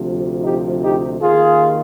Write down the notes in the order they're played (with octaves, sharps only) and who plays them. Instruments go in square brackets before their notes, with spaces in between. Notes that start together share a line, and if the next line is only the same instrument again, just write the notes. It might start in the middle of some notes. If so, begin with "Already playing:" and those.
Already playing: [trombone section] D2 C3 F3
D#4 G4
D#4 G4
D#2 D#3 F4 G#4